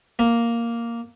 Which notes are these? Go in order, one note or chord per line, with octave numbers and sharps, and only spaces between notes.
A#3